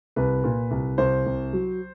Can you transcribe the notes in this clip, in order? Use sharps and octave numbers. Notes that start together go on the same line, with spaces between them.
C2 B4
A#2
C2
C2 C5
C2
F#3